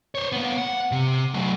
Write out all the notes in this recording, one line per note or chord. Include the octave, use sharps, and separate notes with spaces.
C5 C#5
A#3 B3
F#5
C3
F#3 A3